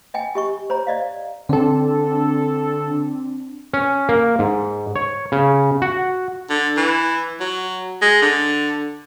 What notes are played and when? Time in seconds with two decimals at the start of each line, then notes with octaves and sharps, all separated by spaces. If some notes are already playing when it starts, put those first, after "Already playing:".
0.14 D#5 G5 G#5
0.35 G4 D#5 C#6
0.70 C5 C#5 A#5
0.87 D5 D#5 F5
1.49 D3 C4 D4 A4
3.74 C#4
4.09 A#3
4.39 G#2
4.96 C#5
5.32 C#3
5.82 F#4
6.50 D3
6.77 E3
7.40 F#3
8.02 G#3
8.22 D3